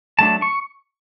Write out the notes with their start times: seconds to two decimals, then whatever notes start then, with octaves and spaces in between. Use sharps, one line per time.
0.19 F#3 A3 D4 A5
0.42 C#6